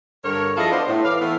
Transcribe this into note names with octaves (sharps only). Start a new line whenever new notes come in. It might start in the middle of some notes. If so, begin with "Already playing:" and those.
G2 D3 A#4 C#5
F3 E4 F4 G#4 A4 D#5
B3 D4 C5
A2
E3 B4 D5 F5
E3 A3 B3 E4